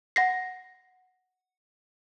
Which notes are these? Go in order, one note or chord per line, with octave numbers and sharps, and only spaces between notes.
F#5 A#6 C7